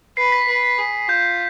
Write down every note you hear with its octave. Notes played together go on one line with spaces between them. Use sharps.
B4 C7
B6
B4
G#4
F4 G6